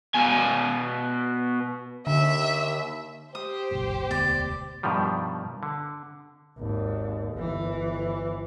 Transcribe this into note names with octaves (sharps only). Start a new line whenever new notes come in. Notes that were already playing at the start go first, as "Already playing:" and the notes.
B2 G#5
D#2 D3 E5
G4 C5 D#6
F#1 B1 A#2
E1 D2 B3 D5
G2 B2 D#3 F3 G3
D3
G#1 D#2
G1 E3